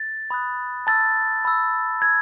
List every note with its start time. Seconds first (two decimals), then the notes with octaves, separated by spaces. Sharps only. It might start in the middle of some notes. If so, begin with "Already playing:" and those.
Already playing: A6
0.31 B5 D#6 F#6
0.87 A5 E6 A6
1.45 B5 E6
2.01 A5 E6 G#6